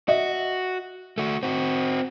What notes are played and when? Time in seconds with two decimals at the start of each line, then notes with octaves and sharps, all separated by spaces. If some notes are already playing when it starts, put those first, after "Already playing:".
0.08 F#4 D#5 E5
1.18 A3 F#4
1.43 C4 F#4